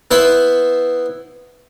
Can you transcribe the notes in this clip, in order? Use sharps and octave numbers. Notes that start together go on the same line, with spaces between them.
B3 E4 B4 C5